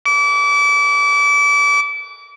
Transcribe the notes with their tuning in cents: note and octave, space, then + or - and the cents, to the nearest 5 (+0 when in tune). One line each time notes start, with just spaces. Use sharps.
D6 -30